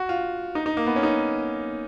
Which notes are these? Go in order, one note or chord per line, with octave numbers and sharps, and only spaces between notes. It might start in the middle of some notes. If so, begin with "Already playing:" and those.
Already playing: F#4
F4
D#4
D#4
A#3
B3
C#4
D#4